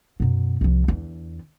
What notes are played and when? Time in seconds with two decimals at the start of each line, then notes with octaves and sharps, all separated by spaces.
0.20 F#2 B2
0.61 C2 F3
0.88 E2 D3